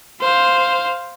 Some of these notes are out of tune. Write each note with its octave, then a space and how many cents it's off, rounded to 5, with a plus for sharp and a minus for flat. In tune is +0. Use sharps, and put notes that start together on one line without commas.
C5 +0 F5 +0